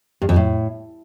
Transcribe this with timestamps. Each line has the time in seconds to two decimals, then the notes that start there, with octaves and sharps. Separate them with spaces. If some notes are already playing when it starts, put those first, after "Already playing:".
0.22 G2
0.29 F2
0.36 A2